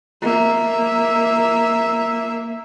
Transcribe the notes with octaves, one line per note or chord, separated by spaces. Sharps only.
A#3 E5